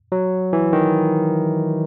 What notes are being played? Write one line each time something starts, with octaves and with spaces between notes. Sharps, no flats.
F#3
E3
D#3